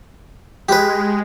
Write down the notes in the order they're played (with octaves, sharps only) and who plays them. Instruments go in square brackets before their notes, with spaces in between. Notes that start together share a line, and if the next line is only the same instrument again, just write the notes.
[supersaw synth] G#3 [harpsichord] G4 B4